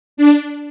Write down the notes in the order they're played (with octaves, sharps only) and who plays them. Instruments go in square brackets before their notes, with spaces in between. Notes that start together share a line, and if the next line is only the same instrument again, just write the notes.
[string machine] D4